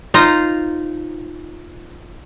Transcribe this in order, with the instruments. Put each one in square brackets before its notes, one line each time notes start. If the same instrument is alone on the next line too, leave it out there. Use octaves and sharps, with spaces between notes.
[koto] D#4 F4 C5 A#5